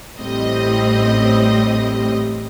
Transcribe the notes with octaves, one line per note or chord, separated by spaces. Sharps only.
A1 A2 G3 C4 D#5 D#6